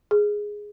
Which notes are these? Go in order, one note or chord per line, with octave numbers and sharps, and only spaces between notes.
G#4